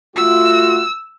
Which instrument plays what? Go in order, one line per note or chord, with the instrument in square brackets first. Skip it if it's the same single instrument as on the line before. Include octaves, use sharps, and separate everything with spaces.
[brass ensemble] A3 F4 F#4 [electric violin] E6